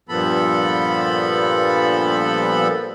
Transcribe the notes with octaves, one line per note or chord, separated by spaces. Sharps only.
G2 A#2 F3 B3 A4 B5